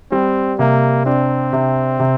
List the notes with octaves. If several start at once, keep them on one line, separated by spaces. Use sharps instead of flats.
G3 C4
C3 A#3
C4 D4
C3
C3